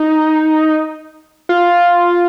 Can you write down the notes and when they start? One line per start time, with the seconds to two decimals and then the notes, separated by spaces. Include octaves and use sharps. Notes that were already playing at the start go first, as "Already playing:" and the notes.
Already playing: D#4
1.49 F4